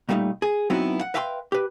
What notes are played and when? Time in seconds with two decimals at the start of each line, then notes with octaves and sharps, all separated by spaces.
0.09 A#2 G3 A3 D4 D#4
0.42 G#4
0.70 F#3 B3 C4 D#4 E4 F#4
1.01 F#5
1.14 B4 E5 F5 G5 G#5 C6
1.52 G4 B4